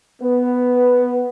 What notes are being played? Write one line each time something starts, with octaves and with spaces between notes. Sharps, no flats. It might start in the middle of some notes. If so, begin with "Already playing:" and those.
B3